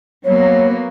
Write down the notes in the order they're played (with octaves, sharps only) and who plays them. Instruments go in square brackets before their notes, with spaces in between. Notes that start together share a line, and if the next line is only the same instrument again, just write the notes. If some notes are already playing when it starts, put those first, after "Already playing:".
[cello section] F#3 A#3 B3 [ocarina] C#5